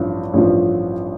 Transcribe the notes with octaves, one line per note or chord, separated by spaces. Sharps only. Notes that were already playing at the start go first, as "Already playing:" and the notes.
Already playing: A1 G2 F3
A1 G2 F3